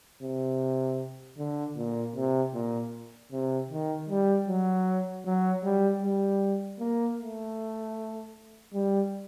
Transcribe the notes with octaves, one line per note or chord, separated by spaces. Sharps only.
C3
D3
A#2
C3
A#2
C3
D#3
G3
F#3
F#3
G3
G3
A#3
A3
G3